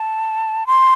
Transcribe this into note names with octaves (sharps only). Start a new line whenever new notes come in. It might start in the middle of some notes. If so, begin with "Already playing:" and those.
Already playing: A5
C6